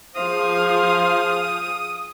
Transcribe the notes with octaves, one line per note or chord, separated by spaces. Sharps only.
F3 G#4 C5 F5 D#6